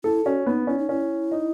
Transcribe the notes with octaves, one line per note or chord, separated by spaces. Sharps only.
E4 A4
C#4 F#4
B3 D#4
C#4 E4
D#4
C#4 E4
D#4